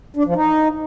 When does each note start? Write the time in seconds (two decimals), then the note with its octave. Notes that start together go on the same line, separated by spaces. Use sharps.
0.16 D4
0.26 F3
0.36 D#4